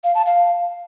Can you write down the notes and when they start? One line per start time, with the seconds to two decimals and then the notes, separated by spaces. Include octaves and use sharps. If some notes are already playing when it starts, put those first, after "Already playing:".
0.04 F5
0.15 A5
0.26 F5